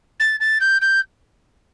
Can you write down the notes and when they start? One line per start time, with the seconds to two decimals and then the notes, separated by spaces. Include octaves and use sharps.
0.20 A6
0.40 A6
0.60 G6
0.81 G6